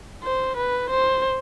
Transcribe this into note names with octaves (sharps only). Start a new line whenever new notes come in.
C5
B4
C5